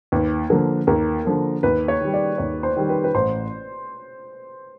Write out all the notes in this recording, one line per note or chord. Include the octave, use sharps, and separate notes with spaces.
D#2 B4
D3 F3 A#3 A#4
D#2 A#4
D3 F3 A#3
D#2 B4
C#5
D#3 G3
D5
D#2 C#5
C5
D#3 G3
B4
B4
A1 C5